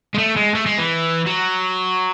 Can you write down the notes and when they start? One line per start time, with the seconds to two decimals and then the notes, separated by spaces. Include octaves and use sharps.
0.14 G#3
0.18 A3
0.36 G#3
0.55 A3
0.66 G#3
0.78 E3
1.27 F#3